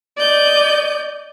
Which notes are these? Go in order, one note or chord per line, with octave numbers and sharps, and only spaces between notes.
D5 D#5 G6